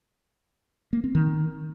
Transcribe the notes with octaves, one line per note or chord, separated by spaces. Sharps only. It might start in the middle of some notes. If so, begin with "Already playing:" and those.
A#3
C4
D#3